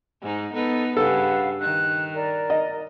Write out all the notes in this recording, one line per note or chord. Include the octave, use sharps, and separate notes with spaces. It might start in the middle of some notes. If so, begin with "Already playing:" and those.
G#2 D#4
B3 D#4 A4 B4
G2 C#3 G3 A4 B4 F5 F#5
D#3 F#6
A#4 D5
D#5